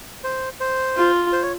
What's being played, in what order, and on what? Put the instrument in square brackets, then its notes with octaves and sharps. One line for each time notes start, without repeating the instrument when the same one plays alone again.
[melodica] C5
C5
[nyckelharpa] F4
[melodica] C5
C#5